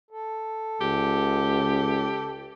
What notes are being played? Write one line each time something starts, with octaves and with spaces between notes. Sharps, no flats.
A4
C#2 G4